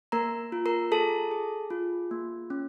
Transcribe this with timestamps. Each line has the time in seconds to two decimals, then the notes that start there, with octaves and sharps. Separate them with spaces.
0.12 A#3 A#4 A#5
0.52 F4
0.66 A#4 A#5
0.92 G#4 A4 A5
1.31 G#4
1.70 F4
2.11 A#3
2.50 C#4